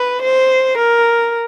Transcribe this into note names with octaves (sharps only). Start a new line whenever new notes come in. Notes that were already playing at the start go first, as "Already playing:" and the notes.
Already playing: B4
C5
A#4